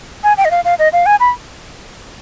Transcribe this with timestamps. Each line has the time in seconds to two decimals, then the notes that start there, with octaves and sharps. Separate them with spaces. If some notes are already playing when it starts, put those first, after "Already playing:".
0.23 G#5
0.37 G5
0.45 D#5
0.51 F5
0.65 F5
0.79 D#5
0.93 F5
1.06 G#5
1.20 B5